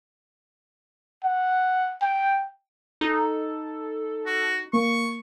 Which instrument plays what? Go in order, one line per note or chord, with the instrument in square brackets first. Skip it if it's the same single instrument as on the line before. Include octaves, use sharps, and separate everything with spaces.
[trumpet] F#5
G5
[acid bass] D#4 [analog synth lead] A4
[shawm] F#4
[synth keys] A#3 [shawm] C#6